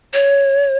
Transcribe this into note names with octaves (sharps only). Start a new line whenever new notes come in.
C#5